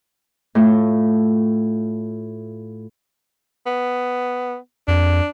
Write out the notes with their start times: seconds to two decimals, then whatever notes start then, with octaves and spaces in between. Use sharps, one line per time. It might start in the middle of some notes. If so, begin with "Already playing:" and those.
0.55 A2 A3 F4
3.66 B3
4.88 F2 D4